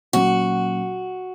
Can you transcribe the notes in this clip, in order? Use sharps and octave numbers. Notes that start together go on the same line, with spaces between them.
A#2 F#3 C#4 F#4